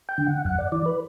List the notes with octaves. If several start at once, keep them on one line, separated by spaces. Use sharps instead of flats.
G5
D3
F#5
F#2 F#5
D5
E3 D5
B4